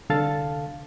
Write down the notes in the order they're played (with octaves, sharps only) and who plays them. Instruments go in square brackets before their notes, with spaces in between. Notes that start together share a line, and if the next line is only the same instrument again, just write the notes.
[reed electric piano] C2 D3 A4 F5 A5 A6